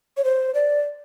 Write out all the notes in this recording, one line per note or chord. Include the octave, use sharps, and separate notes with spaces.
C#5
C5
D5